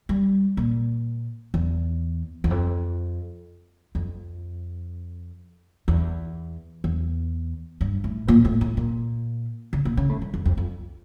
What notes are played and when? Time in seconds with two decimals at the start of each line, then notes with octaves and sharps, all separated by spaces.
0.09 G3
0.57 A#2
1.54 E2
2.44 E2
2.50 F2
3.95 F2
5.88 E2
6.84 E2
7.81 G2
8.04 A2
8.28 A#2
8.45 A2
8.61 A2
8.77 A#2
9.73 C#3
9.85 A#2
9.97 C#3
10.09 A2
10.22 G2
10.34 F2
10.45 F2
10.58 F2